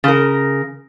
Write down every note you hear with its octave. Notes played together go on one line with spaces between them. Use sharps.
C#3 A#4